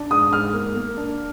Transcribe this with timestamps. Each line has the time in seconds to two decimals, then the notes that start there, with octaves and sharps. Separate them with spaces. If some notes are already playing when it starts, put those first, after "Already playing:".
Already playing: D4
0.11 G#2 D#6
0.32 G#2 F6
0.53 A#3
0.75 A#3
0.97 D4